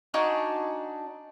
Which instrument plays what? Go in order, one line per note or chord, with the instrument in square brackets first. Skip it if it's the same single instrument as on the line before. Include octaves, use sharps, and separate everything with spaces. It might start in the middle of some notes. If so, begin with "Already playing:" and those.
[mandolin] D4 D#4 F#4 G#5